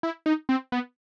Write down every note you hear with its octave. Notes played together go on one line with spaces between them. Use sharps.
E4
D#4
C4
B3